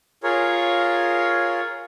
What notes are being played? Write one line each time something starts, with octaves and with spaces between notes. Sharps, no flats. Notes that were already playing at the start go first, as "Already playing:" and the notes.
F4 G#4 A#4 C#5